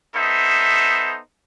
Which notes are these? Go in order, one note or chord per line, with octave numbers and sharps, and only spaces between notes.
B3 D#4 A4 C5 E5